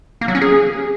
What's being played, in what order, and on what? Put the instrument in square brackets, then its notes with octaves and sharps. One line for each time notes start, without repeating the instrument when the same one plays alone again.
[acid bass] A#3
F#3
C#4
G#4